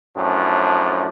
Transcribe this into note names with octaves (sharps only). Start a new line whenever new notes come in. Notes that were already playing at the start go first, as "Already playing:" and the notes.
F#2 A2 F3 D4